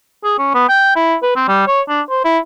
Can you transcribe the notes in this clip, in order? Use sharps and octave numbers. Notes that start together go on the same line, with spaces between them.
G#4
C#4
B3
G5
E4
B4
C4
G3
C#5
D4
C5
E4